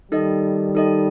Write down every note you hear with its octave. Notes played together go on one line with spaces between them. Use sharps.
D#3 G3 D#4 A4 D#5
D#4 A4 D#5